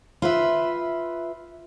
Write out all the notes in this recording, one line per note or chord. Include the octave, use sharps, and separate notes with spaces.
F4 B4 E5